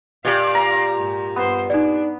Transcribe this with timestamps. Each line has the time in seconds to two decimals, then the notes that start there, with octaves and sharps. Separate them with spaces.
0.25 A#2 G4 D5 F5
0.55 A#5
0.97 G#2
1.36 G2 B3 C5
1.70 D4 D#4 D5